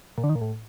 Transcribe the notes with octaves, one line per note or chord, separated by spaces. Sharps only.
A#2
D3
D#3
A#2
A2